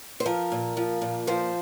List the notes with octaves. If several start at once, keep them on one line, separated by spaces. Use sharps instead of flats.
C5
F3 A#4
A#2
F3
A#2
F3 C5